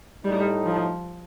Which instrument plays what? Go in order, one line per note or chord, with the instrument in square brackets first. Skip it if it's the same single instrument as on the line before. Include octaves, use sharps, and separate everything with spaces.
[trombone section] A2 A3 D#4 [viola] G3
[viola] F3